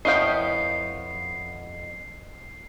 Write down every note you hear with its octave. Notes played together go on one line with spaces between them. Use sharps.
F2 B3 E4 C#5 D#5 F5 G5 C7